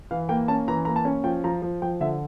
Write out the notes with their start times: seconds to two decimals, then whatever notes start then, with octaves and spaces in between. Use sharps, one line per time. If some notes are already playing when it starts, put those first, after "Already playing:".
0.11 E3 F5
0.29 A#3 G5
0.48 C#4 A5
0.68 E3 A#5
0.85 A#3 A#5
0.96 A5
1.05 C#4
1.24 F3 G5
1.44 F3 A#5
1.62 F3
1.82 F3 G5
2.00 D3 E5